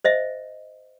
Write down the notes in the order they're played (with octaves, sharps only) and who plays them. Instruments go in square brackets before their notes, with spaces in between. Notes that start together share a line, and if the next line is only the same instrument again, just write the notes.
[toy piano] C5 D#5 E5